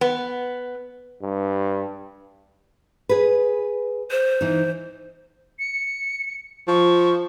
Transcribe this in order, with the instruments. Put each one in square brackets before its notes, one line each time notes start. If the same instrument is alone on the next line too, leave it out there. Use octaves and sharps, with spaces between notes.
[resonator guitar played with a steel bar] B3
[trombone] G2
[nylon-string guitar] G#4 B4
[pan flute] C5
[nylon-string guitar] E3 D#4
[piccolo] C#7
[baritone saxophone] F3 [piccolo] C#6